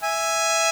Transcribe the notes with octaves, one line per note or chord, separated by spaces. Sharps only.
E5 G#5